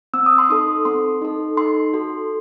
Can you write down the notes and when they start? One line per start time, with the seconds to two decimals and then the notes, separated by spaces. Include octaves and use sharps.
0.14 C4 E6
0.26 D#6
0.38 C6
0.50 D#4 A4 D#6
0.85 C4 C6
1.22 D#4 A4
1.57 D#4 C6
1.94 F#4 A4